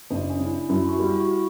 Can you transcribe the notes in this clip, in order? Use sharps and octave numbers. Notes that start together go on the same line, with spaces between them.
F#1 D4
C#4
C#3
E4
D4
F#2 E4
F#4
G3
E4
F#4
E4